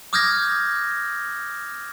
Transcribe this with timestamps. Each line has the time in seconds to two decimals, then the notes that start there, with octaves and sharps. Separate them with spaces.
0.13 D6 D#6 F6 G6 G#6 A#6